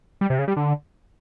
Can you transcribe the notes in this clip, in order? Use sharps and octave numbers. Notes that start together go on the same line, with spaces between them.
G3
C3
C#3
G3
D3